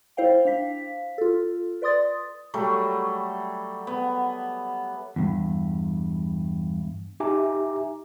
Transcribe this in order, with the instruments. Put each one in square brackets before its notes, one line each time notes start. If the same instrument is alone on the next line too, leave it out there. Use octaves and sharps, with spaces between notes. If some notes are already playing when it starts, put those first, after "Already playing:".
[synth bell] E4 C5 F5 G5
D4 F5 B6
F4 A4
B4 D5 C6 D#6 A6
[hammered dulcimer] F#3 G3 A3
B3
[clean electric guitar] E2 G2
[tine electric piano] D#4 G4 E5 G#5 A#5 D6